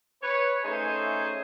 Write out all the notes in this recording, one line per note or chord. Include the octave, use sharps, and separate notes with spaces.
B4 C#5
A3 C#4 D#4 G#4 C5 G#5